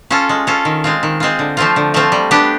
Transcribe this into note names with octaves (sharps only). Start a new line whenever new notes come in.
C#4 F4 A4
G#3
C#4 F4 A4
D#3
G#3 C4 F4
D#3
G#3 C4 F4
D3
F3 A3 C4 F4
D3
F3 A3 C4 F4
G3
B3 D4 G4